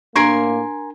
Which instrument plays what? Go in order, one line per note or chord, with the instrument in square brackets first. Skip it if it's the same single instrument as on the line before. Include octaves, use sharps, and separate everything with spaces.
[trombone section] A2 A#3 [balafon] D4 [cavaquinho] A#4 G#5 C6